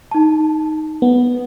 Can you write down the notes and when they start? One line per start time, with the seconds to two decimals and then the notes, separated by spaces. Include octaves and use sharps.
0.11 D#4 A5
1.02 B3